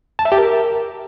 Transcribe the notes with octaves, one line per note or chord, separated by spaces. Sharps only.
A5
E5
G4
A#4